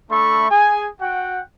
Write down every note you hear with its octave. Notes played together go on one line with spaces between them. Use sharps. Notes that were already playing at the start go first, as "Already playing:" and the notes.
A3 D4 A4 E5 B5 C#6
G#4 G#5
F#4 F#5 G5